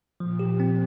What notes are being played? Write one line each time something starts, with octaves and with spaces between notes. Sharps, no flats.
A#2 F3
G4
C4